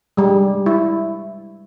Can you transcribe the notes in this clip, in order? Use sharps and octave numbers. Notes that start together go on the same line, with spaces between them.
G3 G#3
E4